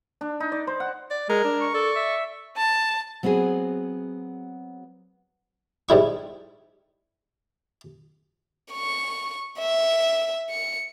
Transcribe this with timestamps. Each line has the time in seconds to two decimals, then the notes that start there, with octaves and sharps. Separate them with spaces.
0.21 D4
0.40 D#4
0.52 D5
0.67 C5
0.80 F#5
1.10 D5
1.29 G#3 A#4
1.44 D4
1.61 C#6
1.74 A4 D5
1.96 E5
2.56 A5
3.23 F#3 B3 C4 F#4 G#4
5.89 G#2 G3 E4 C#6
8.72 C#6
9.59 E5
10.49 C#7